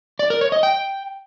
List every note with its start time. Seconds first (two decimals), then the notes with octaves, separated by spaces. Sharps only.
0.19 D5
0.30 A#4
0.41 C#5
0.52 D#5
0.63 G5